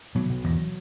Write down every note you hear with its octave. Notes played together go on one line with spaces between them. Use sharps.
B2 F#3
B2
E2